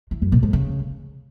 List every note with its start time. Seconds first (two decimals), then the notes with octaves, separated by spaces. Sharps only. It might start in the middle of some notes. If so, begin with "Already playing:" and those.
0.11 E3
0.22 F#2
0.32 A#2
0.43 G#2
0.53 C#3